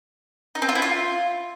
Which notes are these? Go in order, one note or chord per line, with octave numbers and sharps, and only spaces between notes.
D#4
C4
F4
E4
F4